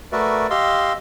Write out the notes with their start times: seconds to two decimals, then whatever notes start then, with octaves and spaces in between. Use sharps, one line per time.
0.12 A3 F#4 A#4 B4 D5 E5
0.50 G4 D#5 F5 C6 E6